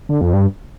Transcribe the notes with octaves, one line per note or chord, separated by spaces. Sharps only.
D3
F2
G2